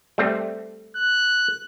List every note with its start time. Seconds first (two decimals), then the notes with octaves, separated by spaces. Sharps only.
0.18 G3 A3 C4
0.96 F#6